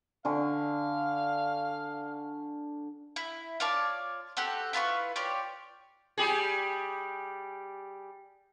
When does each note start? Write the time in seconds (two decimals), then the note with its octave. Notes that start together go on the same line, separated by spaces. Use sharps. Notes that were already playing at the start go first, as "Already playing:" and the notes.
0.25 D3 F5 G#5 C#6
3.16 E4
3.60 F4 C#5 D5 A5
4.37 C4 F#4 G4 A4
4.73 E4 F4 B4 C#6
5.16 F4 G4 C#5 D5
6.18 G3 G4 G#4